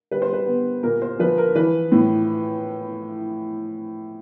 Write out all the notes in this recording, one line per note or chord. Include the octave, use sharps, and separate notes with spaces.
G3 B4
C5
B4
B3
A#2 A#4
C5
F3 B4
A#4
E3 B4
A2